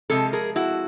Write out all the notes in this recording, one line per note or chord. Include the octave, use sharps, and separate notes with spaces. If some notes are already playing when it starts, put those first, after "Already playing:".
C3 F3 G#3 A4
G#4 A#4
E4 F#4